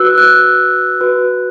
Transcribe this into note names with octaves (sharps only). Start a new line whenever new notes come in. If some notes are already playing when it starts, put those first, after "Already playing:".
Already playing: F#4 B4 E6 F#6
F#6
F#4 B4